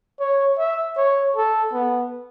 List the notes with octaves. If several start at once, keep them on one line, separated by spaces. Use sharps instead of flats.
C#5
E5
C#5
A4
B3